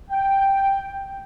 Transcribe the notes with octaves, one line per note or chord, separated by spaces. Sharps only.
G5